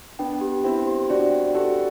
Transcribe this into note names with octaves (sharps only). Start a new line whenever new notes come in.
B3 D4 G5
G4
C4 E4 G5
G4
D4 F#4 D5
G5
F#4 G4 A4